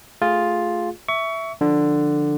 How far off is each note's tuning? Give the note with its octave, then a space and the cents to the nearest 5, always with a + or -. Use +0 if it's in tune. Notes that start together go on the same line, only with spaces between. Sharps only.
A3 +0 F4 +5 G#4 +0
E5 +0 C#6 +25
D3 +10 F3 +0